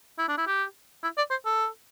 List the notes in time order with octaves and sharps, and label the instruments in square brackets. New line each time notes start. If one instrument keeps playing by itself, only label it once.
[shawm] E4
D4
E4
G4
E4
D5
C5
A4